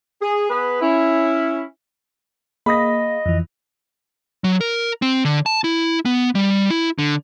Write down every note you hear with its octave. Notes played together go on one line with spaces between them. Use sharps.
G#4
B3 G#4 B4
C#4 E4
A#3 G#4 D#5 F5 B5 D#6 A#6
F2 E3
F#3
A#4
C4
D3
A5
E4
B3
G3
E4
D3